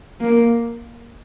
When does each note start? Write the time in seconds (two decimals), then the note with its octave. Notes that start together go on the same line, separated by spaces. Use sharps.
0.20 A#3